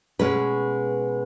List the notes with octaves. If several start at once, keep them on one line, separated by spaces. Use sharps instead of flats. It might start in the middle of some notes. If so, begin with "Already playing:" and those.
B2 G#3 C#4 B4